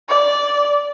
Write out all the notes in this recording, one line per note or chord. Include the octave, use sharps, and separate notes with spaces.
D5